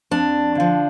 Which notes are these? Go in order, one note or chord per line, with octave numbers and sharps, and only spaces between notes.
F2 D4
D3 F3